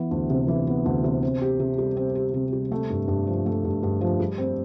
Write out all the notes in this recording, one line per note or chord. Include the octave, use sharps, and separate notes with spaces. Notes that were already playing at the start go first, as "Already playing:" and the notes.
Already playing: E3 B3
D2
C3
E3
B3
D2
C3
C4
G4
C3
G3
C4
G4
C3
G3
A3
G2
G2
F3
A3
G2
G2
F3
G3
C4